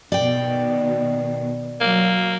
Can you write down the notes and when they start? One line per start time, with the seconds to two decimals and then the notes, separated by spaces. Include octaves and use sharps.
0.12 B2 D#3 D5 G5
1.81 F#3 A#3